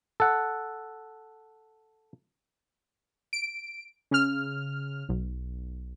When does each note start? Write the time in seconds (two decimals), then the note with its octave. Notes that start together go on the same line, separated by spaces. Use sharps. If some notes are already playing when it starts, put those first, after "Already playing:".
0.20 A4 F#5
3.33 D7
4.11 C#3 F6
5.09 B1